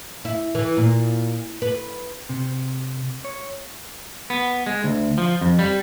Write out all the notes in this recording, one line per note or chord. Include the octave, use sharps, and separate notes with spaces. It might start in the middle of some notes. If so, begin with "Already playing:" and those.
E4
E3
A#2
B4
C3
C#5
B3
G#3
D2
F3
F2
G3